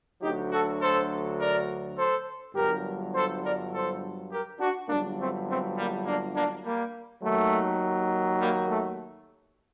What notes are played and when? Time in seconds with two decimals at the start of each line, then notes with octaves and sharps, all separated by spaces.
0.22 D2 D3 F#3 D#4 G4
0.51 F#4 A4
0.80 A4 C5
1.38 A#4 D5
1.97 A4 C5
2.55 G1 G2 F#3 G4 A#4
3.13 A4 C5
3.43 A#4 D5
3.72 A4 C5
4.31 G4 A#4
4.60 D4 F#4
4.89 G1 G2 F#3 A#3 D4
5.19 A3 C4
5.48 A3 C4
5.77 G3 A#3
6.05 A#3 D4
6.35 A#3 D4
6.64 G3 A#3
7.22 D#2 D#3 F#3 A3
8.40 G3 A#3
8.69 A3